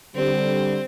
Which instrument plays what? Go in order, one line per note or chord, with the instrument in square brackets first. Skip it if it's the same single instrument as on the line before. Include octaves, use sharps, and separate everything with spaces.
[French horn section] D3 G3 [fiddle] C4